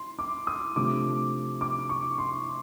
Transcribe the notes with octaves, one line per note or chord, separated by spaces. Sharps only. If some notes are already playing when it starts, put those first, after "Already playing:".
Already playing: C6
D6
D#6
C3 F3 A3 D4 D6
D6
C#6
C6